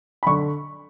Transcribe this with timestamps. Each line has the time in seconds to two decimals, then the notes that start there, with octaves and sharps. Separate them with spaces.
0.23 B5
0.26 D3 C#6